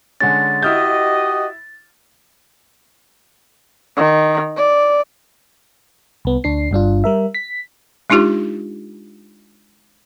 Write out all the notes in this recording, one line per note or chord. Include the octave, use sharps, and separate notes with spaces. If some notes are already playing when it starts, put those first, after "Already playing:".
D3 G#3 C#4 A6
E4 F#4 G4 D#5 F6 G6
D#3
D5
C2 B3
D2 D4 C7
G1 G2 D4 F4
G3 A#4 E5
B6
G#3 D4 D#4 F4 G4